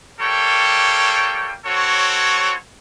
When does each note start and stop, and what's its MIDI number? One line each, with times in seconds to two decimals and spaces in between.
0.20 1.52 55
0.20 1.52 58
0.20 1.52 69
0.20 1.52 73
0.20 1.52 79
1.65 2.53 60
1.65 2.53 66
1.65 2.53 69
1.65 2.53 73